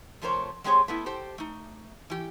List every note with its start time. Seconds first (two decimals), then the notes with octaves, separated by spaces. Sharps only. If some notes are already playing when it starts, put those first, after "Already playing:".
0.22 C3 F3 A3 A#4 C5 C#5
0.64 G#3 C4 G4 G#4 C5 C#5
0.88 A3 B3 E4
1.06 G4 A4 C5 G5
1.38 A3 D#4
2.10 E3 G4